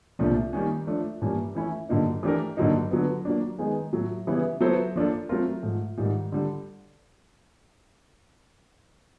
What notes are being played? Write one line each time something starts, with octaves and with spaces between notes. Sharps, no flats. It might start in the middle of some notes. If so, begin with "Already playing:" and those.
C2 A#2 F3 A3 D4
D#3 G3 A#3 C#4
F3 A3 D4
G2 E3 G3 A#3 C#4
E3 A3 C#4 E4
G2 D3 F#3 A#3 D#4
E3 A3 D4 G4 A#4
G2 D3 F#3 A#3 D#4
D3 F#3 B3
F#3 A#3 D4
D#3 G#3 B3 D#4 G#4
A2 F#3 A3
C#3 E3 G3 B3 E4
F#3 B3 E4 A4 C5
F3 A#3 D4 F4 A4
F#3 A3 C4 F4 A#4
G#2 F3 A3
G#2 D#3 G3
D3 G3